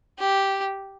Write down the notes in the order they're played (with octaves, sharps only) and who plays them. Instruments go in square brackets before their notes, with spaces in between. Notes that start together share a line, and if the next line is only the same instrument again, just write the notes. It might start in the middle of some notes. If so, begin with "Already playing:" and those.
[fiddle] G4